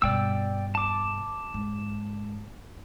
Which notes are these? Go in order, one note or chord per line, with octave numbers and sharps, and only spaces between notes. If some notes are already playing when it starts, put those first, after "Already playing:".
G2 B2 D5 G5 E6
A5 D6
G#2